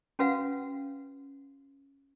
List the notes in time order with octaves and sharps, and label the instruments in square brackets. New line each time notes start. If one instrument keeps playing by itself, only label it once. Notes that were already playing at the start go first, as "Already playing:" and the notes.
[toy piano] C#4 F#4 B4 F5 F#5